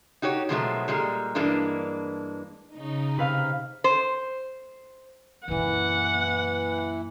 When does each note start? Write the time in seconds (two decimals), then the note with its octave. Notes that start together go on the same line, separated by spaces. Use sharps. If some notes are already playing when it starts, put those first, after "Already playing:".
0.22 D#4 F#4 G4 C#5
0.49 B2 D#3 F3 F#3 G#3 A3
0.88 A#2 G3 G#3
1.35 G2 E3 G#3 A#3 D4
2.75 C#3 D#4
3.17 C3 B4 F5
3.84 C5
5.48 F#2 A#2 E3 F#5